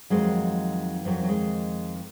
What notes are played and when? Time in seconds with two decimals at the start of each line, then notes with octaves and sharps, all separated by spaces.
0.10 F2 D#3 F#3 G#3
1.05 F2 D#3 F#3
1.23 F#3
1.29 G#3